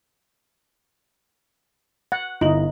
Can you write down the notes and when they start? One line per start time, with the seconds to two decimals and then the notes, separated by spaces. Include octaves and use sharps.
2.12 F#5
2.41 G1 D#4 E4 F#7